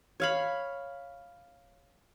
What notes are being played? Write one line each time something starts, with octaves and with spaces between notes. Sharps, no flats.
C#5 F5 B5